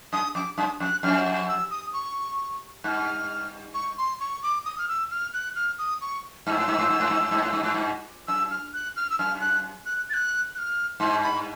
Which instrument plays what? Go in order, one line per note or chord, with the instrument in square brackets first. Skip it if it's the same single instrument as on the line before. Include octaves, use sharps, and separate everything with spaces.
[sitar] F#2 [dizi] D#6
[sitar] F2 [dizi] D6
[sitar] F#2 [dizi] D#6
[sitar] F2 [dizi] F#6
[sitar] F2 [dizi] F6
[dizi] E6
D#6
C#6
[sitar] G2 [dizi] F#6
[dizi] F6
C#6
C6
C#6
D6
D#6
F6
E6
F6
F#6
F6
D#6
C#6
[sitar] G2 [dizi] F6
[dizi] E6
[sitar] G#2
G2
G#2
G2
G#2
G2
G#2
G2
G#2
G2
G#2
G2
[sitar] F#2 [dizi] E6
[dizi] F6
F#6
F6
E6
[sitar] F#2 [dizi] F6
[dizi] F#6
F#6
A6
F#6
F#6
F6
[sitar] G2 [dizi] C6
[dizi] B5